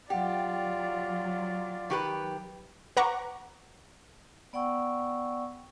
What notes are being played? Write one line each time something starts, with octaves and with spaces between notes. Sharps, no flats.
F#3 F4 G4 D5 F#5 G5
D#3 G4 B4
B4 F#5 A#5 C#6 D6
B3 D5 F#5 G5 C#6 E6